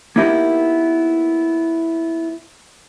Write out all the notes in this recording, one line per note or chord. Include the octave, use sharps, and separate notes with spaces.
A#3 B3 D#4 E4 G4 A#4